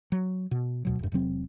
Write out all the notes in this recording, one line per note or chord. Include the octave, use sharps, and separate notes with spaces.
F#3
B2
D2 B2 F#3
E1 G2
E1 C3 F#3 C4